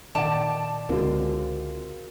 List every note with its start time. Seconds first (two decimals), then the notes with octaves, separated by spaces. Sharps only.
0.15 A#2 D#3 D5 D#5 G5 A5
0.89 C#2 D3 G#3 C4 F4 F#4 A#4